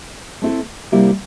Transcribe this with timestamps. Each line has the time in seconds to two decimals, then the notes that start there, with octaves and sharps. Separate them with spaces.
0.42 A3 C4 E4 A4
0.92 C3 G3 A#3 E4 G4